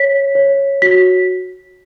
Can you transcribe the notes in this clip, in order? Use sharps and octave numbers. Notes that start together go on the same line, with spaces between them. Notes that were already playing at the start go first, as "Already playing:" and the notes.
Already playing: C#5 B6
C#5
F#4 B6